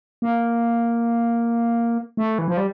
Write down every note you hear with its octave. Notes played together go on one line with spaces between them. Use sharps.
A#3
A3
E3
F3
G3